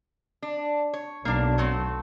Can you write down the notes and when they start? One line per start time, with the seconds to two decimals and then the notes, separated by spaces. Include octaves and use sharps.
0.42 D4
0.94 C#5
1.25 B1 A#3 D4
1.58 F#3 A3 C4